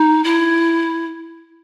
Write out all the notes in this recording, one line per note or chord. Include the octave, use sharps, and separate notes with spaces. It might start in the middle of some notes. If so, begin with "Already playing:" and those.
Already playing: D#4
E4